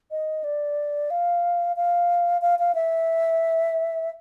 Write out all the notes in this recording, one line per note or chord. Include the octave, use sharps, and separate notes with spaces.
D#5
D5
F5
F5
F5
F5
E5